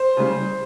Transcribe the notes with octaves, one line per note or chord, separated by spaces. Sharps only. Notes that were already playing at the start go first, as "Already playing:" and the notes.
Already playing: C5
C#3 G3